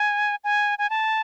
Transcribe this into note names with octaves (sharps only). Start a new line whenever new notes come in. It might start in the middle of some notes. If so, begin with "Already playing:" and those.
Already playing: G#5
G#5
G#5
A5